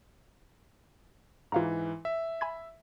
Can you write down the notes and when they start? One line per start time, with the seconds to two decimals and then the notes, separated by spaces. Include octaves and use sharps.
1.52 G#2 E3 F4 F5 A#5
2.05 E5
2.41 G#5 B5 G#6